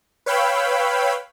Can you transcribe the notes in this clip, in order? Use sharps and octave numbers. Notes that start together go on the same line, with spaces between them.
B4 C#5 F5 G5 B5 E6